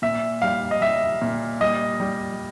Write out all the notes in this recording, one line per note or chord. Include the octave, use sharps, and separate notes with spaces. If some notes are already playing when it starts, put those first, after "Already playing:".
A#2 E5
G3 F5
D#5
G3 E5
A#2
G3 D#5
G3